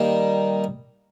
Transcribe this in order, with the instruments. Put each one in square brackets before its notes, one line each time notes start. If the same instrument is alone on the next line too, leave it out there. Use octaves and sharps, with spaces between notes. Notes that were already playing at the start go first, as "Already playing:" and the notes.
Already playing: [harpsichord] D#3 G3 A#3